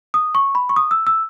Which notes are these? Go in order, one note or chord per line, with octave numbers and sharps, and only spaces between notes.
D#6
C#6
B5
C#6
D#6
E6
E6